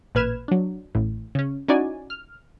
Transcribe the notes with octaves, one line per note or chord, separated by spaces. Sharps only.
A1 A#2 B4 F6 G#6 E7
F#3 D4
A1 A2
C#3 C#4
C#4 D#4 E4 F#4 D5 G#5
F6